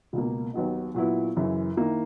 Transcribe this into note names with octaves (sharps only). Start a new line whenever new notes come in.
C#2 B2 A#3
D#2 D#3 F#3 B3 D#4
A#2 F#3 B3 E4
F#2 C#3 E3
D#3 A#3 E4